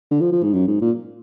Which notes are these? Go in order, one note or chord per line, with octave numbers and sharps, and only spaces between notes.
D3
F3
F3
G#2
F#2
G#2
A#2